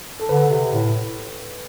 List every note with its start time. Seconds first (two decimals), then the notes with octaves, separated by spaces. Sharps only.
0.20 A4
0.29 D3 B4
0.50 C3
0.72 A2